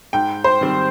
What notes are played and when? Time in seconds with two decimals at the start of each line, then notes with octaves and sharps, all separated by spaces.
0.13 G#2 G5
0.44 C5
0.61 D#3 G3 C4